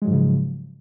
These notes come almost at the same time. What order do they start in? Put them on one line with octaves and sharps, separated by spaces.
G#3 F#3 G#2 F3 C#3